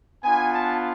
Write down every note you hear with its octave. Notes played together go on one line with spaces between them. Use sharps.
B3 D4 F4 G#5
A5